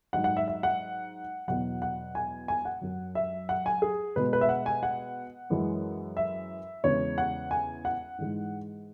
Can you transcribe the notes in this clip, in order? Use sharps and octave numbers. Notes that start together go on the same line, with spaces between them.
G#2 F#3 F#5
F#5
E5
E5
F#5
E2 B2 F#3 F#5
F#5
G#5
G#5
F#5
F#2 F#3
E5
F#5
G#5
G#4
B2 G#3 B4
B4
E5
F#5
G#5
F#5
F#2 E3 G#3
E5
E2 C#3 E3 G#3 C#5
F#5
G#5
F#5
G#2 E3 G#3